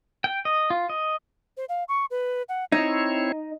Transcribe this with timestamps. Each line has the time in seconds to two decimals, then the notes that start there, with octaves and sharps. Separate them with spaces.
0.24 G5
0.45 D#5
0.70 F4
0.89 D#5
1.57 C5
1.69 F5
1.89 C#6
2.11 B4
2.49 F#5
2.72 C4 D#4 E4 C#5